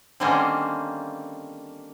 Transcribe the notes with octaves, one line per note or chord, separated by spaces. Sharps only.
D3 D#3 G3 A#3 C4 C#4